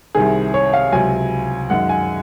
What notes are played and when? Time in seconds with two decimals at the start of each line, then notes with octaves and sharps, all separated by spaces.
0.15 C2 C3 D#3 G#4
0.54 C#5
0.73 F5
0.92 C#2 C3 F#3 G#5
1.70 F#2 D#3 G#3 F#5
1.89 G#5